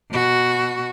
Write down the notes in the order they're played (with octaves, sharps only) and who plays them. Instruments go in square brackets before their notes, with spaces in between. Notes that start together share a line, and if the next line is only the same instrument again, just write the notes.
[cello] B2 F#4